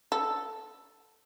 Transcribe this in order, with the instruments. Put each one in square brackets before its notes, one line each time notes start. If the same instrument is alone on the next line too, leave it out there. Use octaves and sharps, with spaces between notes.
[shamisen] A4